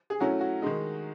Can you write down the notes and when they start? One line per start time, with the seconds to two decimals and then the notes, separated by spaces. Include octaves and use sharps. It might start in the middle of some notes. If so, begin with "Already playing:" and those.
0.10 G#4
0.20 F#3 A3 C#4 E4 F#4
0.41 F#4
0.62 D#3 G#3 D#4